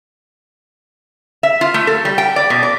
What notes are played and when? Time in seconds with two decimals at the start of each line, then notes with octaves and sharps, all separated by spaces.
1.43 E5
1.61 F4
1.74 A3
1.87 A4
2.05 G3
2.18 G5
2.36 D5
2.50 B2
2.63 D5